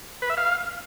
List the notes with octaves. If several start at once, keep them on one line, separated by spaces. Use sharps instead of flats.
B4
E5
F5